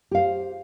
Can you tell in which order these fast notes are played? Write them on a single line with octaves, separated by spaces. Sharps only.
G4 F5 C5